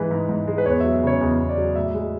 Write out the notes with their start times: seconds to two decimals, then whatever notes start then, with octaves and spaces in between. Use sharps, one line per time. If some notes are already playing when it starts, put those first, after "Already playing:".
Already playing: G#2 E3 G#3 B4
0.11 G#2
0.29 G#2
0.48 G#3
0.58 B4
0.66 E2 C#5
0.80 F#3 E5
0.93 E5
1.03 C#3 C#5
1.21 E2
1.39 E2
1.49 D5
1.58 F#3
1.75 A2 E5
1.95 G#3